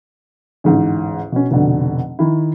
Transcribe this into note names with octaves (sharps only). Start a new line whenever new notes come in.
A1 D2 G#2
B2 C#4
F1 B2 D3
D#3 E4